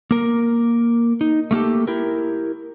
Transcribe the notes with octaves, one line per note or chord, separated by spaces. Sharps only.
A#3 A#4
D#4
A3 A#3 G4 A4
E4 G4 A#4